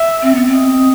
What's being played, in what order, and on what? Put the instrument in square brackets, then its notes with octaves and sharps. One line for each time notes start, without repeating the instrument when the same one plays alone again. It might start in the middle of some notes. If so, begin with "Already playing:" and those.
Already playing: [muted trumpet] E5
[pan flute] C4
B3
C4
[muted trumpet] D#5